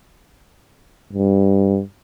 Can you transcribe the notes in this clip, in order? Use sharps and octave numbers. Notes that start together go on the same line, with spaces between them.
G2